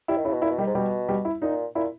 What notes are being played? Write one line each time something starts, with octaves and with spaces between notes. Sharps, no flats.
G3 E4
D#3
C#3 E4
B2
A#2 E4
B2
D#3 G3 G4
G#2
B2 G3 G4
G3 G4
E4
A#2 D#4
A#2 E4